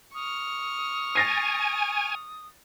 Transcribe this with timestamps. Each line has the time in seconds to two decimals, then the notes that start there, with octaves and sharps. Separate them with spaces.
0.15 C#6 D#6 F6
1.15 G#5 A6 A#6 C7